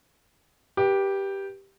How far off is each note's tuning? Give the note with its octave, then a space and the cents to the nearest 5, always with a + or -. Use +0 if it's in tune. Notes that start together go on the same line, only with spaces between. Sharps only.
G4 +0 B4 -30